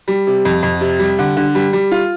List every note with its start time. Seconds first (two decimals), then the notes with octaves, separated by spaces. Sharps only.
0.08 G3
0.27 C3
0.45 F2
0.63 F2
0.81 C3
0.99 G3
1.19 D3
1.37 D3
1.55 G3
1.73 G3
1.91 F4